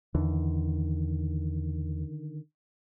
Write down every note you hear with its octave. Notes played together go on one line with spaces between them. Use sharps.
E2 D3 D#3